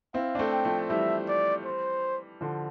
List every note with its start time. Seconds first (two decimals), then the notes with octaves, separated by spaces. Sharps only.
0.14 C4 E4 F5
0.35 D4
0.39 A3 C4
0.52 G5
0.65 F3 A3
0.90 E3 G3 E5
1.29 D5
1.66 C5
2.41 D3 F3